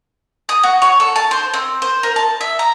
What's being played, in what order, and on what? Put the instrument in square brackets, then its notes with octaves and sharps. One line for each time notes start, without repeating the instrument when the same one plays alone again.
[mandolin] D#6
F#4
C#5
A4
A5
C5
C4
C5
A#4
A5
E5
A#5